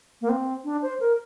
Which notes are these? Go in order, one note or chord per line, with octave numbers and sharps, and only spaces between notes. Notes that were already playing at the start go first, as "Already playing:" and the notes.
A#3
C4
D4
C5
A#4